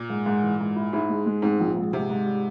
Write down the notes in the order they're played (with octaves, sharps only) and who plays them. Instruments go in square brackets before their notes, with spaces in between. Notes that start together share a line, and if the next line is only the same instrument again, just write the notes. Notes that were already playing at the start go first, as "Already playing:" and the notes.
Already playing: [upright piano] A#2
[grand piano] G#2
G#2
E3
G#2
E4
[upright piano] G#2 [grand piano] E4
[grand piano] G#3
G#3
[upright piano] G#2 [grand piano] C4
[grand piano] A#1
G#2
[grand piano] G#2 [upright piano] C3
[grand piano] G#2
G3